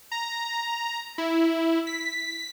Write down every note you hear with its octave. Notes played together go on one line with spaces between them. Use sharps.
A#5
E4
B6